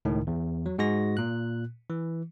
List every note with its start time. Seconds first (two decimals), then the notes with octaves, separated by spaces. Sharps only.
0.05 C#2 A2 D#3
0.27 E2
0.66 F#3
0.78 G#2 G#3 F#4 A#6
1.17 A#2 F#6
1.90 E3